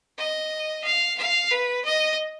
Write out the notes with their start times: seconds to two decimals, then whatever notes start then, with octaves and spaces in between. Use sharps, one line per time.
0.18 D#5
0.84 F5
1.18 F5
1.51 B4
1.85 D#5